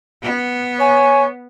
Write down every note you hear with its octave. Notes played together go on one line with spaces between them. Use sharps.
B3
C#5 G#5